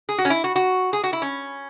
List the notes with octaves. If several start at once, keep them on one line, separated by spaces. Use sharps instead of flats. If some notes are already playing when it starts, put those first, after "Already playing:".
G#4
F#4
C#4
E4
F#4
F#4
G#4
F#4
E4
C#4